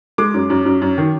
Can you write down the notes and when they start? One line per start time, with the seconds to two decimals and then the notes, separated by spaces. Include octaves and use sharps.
0.18 G#3 D6
0.34 F#2
0.50 F#2
0.66 F#2
0.81 F#2
0.98 D#3